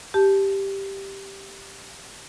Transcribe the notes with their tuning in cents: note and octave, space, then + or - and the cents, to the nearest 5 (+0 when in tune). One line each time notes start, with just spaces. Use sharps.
G4 +0 A5 -20